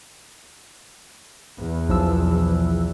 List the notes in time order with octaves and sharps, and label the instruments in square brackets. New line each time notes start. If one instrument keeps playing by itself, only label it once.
[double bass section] E2
[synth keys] B1 F3 E6